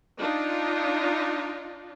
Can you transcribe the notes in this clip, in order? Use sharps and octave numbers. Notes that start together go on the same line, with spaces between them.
D4 D#4 F4